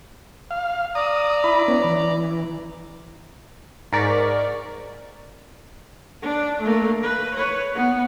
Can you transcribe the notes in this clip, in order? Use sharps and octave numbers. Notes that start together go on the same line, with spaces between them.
F5
D5 A#5 D#6
E4 B5
B3 C#4
E3
G#2 A#4 D5 C#6 B6
D4
A3 A#3
B4
B4 C#5
B3